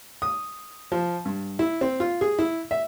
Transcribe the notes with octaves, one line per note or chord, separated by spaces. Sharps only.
D#6
F3
G2
E4
C4
F4
G#4
E4
E5